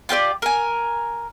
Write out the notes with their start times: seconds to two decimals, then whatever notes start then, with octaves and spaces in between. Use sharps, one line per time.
0.09 F4 G4 A#4 D5
0.42 A#4 G#5